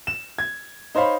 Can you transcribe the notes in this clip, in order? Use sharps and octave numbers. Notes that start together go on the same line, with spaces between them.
E7
G#6
D#4 C5 C#5 F5 B5